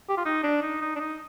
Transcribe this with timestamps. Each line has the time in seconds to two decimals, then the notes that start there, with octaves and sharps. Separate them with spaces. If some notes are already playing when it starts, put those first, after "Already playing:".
0.09 G4
0.17 F4
0.25 D#4
0.43 D4
0.62 D#4
0.81 D#4
0.95 D4
1.00 D#4